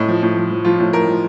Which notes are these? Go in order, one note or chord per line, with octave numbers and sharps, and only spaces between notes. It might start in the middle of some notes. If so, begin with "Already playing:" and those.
Already playing: A2 D#4
F3
A2
F3
F3
F3 F4
A2
A2 A#4
F3